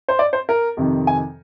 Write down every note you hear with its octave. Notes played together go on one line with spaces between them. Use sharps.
C5
D5
C5
A#4
F2 C3 D#3
G#5